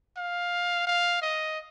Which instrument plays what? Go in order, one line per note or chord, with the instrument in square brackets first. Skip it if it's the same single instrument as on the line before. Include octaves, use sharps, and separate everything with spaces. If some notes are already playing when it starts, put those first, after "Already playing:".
[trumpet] F5
F5
D#5